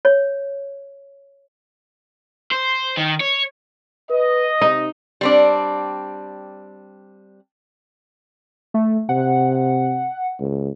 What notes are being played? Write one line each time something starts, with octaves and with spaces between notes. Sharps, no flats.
C#5
C5
D#3
C#5
B4 D#5
C3 D#4
G3 C4 D4
A3
C3 F#5
C#2